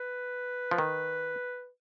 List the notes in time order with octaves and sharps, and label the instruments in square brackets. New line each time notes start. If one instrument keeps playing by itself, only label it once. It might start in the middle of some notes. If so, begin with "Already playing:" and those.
Already playing: [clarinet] B4
[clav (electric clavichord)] F3
D#3